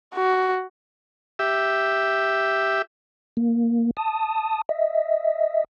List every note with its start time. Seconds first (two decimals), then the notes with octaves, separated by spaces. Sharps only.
0.14 F#4
1.39 G4 E5
3.37 A#3
3.97 A5 D#6
4.69 D#5 E5